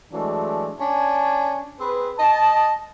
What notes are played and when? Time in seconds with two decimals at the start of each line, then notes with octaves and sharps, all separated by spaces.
0.12 E3 F#3 G#3 A3 D4
0.80 C#4 D4 D5 G#5 A5
1.80 C4 G#4 B4
2.17 D#5 A5